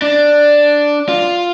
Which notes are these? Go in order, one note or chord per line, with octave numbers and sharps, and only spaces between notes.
D4
F4